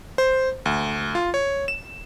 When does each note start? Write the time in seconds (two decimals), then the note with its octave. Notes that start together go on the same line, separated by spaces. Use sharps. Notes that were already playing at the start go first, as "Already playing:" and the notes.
0.18 C5
0.66 D2
1.15 F4
1.34 C#5
1.68 E7